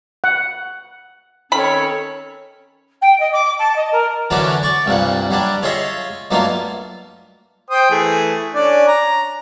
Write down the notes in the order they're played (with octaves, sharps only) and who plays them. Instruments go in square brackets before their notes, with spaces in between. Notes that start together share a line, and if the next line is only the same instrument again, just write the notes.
[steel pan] F#5
[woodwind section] D#3 C4 C#4 [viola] A4 C#5 [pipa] B5
[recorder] G5
D#5
D6
A5
D#5
A#4
[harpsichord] D3 E3 F#3 C#4 D4 F#4
D5 C#6
C2 G2 A#2 F#5
F#3 G3 D4
F4 G#4 C#5 D#5 E5
G2 F#3 A3 A#3 D#4 F4
[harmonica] C5 G5 D#6
E3 A3 G#4
C#4 D4 D5
A#5